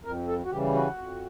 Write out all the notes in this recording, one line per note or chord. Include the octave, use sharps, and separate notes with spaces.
F2 A#4
A4
F#4
C#3 E3 G3 G4
F#4
F2